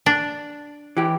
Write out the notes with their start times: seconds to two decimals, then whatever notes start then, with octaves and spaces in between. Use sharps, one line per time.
0.06 D4
0.97 E3 G4